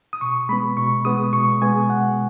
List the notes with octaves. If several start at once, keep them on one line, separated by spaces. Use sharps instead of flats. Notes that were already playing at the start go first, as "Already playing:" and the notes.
D#6
B2 C#6
G#3 B3 B5
B2 C#6
G#3 B3 D#6
B2 C#6
G#3 B3 G#5
B2 F#5